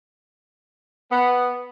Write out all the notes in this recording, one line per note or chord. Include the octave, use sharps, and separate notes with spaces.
B3